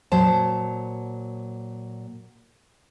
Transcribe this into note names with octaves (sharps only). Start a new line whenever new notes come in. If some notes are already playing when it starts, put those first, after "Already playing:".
A#2 F#3 C5 A5